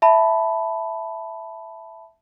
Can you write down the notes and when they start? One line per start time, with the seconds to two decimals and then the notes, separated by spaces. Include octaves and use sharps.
0.02 E5 A5 B5